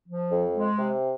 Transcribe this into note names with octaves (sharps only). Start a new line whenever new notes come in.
F3
F2
G#3
C3